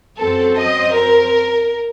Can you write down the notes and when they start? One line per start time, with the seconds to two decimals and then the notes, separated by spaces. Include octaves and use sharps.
0.17 F#2 F#3 C4 A4
0.57 D#5
0.94 A#4